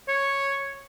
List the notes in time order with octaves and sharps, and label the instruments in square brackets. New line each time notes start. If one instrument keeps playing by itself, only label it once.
[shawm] C#5